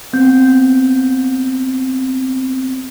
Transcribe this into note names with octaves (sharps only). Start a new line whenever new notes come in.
B3 C4 G6